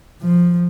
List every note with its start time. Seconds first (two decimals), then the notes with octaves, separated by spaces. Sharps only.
0.22 F3